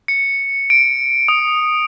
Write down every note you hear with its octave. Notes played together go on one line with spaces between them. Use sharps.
C#7
D7
D#6